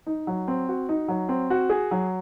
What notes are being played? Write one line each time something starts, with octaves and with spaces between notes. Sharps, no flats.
D#4
F#3
C4
F#4
D#4
F#3
C4
F#4
G#4
F#3